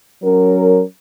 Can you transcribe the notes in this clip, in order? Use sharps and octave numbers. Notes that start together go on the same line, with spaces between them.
F#3 C#4 A#4